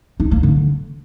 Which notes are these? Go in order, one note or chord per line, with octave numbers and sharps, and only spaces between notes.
D#4
A#3
D3